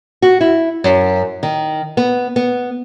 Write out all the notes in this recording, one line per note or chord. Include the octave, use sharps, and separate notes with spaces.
F#4
E4
F#2
D#3
B3
B3